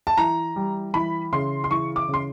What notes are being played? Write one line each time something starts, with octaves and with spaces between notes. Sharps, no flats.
A5
E3 A#5
G3
E3 B5
C#3 C6
C6
E3 C#6
D6
C#3
C6